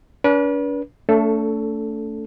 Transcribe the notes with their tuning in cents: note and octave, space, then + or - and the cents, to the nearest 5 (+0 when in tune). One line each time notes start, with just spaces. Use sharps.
D4 -45 B4 -35
A3 +20 D4 -45 A4 +0